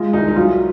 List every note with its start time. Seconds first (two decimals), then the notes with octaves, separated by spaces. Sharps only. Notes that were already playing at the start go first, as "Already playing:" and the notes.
Already playing: G#3 F4
0.13 C2 D#4
0.28 D#4
0.36 F#3 F4